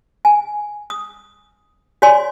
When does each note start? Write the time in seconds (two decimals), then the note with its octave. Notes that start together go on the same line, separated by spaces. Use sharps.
0.25 G#5
0.90 D#6
2.02 F#4 C#5 D5 G#5 C6